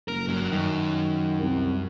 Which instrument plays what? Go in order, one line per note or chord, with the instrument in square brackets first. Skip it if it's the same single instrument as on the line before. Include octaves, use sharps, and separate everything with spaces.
[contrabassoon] F#1 [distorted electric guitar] A#4
[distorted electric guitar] G2 F#3
[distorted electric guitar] F#2 [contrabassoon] D#3
[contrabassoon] C2